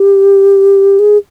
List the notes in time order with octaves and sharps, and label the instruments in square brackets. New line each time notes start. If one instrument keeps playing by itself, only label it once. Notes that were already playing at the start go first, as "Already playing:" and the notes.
Already playing: [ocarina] G4
G#4